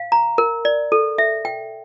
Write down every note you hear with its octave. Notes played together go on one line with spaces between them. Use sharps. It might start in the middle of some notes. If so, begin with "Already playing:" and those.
Already playing: F5
A#5
A#4
D5
A4
E5
G5